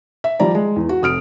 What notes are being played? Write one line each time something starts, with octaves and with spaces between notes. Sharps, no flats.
E5
F3 G3 D5 A#5
G#3
E2
F#4
F1 D#6 F6 D7